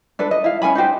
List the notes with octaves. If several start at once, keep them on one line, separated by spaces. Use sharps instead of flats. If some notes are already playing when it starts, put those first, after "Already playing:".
D4 A4 B4
D#5
E4 F5
C#4 A4 G#5 B5
D#4 F#4 G4 C5